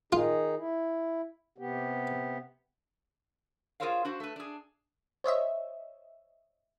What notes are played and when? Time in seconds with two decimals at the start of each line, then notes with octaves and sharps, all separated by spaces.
0.12 D#3 D#4 F4 G#4
0.58 E4
1.58 C3 B3 G4
3.80 F4 G#4 A#4 C5 C#5 F5
4.05 D4 F#4 C5
4.20 A3 B4
4.36 D4 G#4
5.24 C5 C#5 D#5 E5